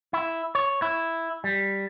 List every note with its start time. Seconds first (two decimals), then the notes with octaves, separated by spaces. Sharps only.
0.13 E4
0.55 C#5
0.82 E4
1.44 G3